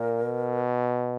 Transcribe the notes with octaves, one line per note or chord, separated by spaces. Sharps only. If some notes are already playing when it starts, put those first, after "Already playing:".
Already playing: A#2 A#4
B2